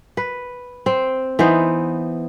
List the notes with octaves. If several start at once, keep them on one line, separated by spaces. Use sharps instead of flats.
B4
C4
E3 B3 D#4 C5